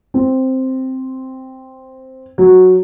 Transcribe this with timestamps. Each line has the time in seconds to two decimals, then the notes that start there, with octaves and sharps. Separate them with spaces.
0.14 C4
2.38 F#3